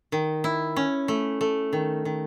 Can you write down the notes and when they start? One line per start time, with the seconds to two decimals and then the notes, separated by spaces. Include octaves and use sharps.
0.12 D#3
0.44 E4
0.76 C#4
1.08 A3
1.41 A3
1.73 D#3
2.05 D#3